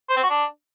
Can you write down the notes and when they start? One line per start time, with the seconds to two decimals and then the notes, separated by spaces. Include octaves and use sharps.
0.10 C5
0.16 C4
0.23 F#4
0.30 D4